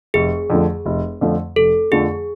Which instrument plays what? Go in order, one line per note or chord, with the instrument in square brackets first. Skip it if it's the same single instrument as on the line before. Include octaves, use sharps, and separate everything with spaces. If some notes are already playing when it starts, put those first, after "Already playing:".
[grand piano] F1 [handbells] G#4
[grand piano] F2 D3 F3 A3
F1
F2 D3 F3 A3
[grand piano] F1 [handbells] A4
[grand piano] F2 D3 F3 A3 [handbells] G#4